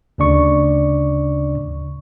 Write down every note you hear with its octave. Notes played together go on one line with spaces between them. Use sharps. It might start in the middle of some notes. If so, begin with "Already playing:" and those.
D2 C#3 D4 D5 C#6